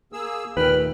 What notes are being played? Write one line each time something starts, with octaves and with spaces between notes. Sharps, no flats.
A#3 G#4 E6
D#2 A#2 B4 G5 F6
A3